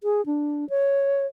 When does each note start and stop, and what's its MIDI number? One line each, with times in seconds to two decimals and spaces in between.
0.03 0.24 68
0.26 0.68 62
0.70 1.26 73